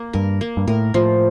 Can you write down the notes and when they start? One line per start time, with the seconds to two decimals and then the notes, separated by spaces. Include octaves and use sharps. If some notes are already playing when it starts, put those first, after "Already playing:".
Already playing: A#3
0.13 G2 A#4
0.41 A#3
0.57 G2
0.68 A2 A#4
0.94 A2 F3